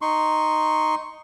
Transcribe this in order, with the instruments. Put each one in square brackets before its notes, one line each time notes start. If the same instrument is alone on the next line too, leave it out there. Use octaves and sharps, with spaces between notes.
[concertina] D#4 C6 C#6